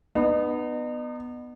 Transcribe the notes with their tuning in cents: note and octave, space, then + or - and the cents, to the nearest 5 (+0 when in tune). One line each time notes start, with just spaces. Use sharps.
B3 +0 D#4 -40